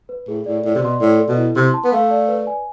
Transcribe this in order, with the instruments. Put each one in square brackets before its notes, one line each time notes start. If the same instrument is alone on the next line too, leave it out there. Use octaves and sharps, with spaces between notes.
[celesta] B4
[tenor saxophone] A2 [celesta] G#4
[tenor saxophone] A2 [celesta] D5
[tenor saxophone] A2 [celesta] D5
[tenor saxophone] C3
[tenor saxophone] B2 [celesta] C6
[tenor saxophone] A2 [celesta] D5
[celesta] A4
[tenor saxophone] B2
[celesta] E4
[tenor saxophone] C3 [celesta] C6
[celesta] A5
[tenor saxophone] B3
[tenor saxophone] A3 [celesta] F5
[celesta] D5
B4
G#5